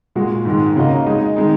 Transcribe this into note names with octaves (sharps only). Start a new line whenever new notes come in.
A#2 G#3 F#4
G#2 D#3 G#3
C#3 A#3 F#4 D#5
G#3 D#4 G#4 D#5
D#3 G#3 D#4